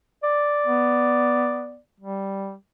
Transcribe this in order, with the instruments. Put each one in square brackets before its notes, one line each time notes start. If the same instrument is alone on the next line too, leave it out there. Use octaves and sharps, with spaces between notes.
[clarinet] D5
[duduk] B3
G3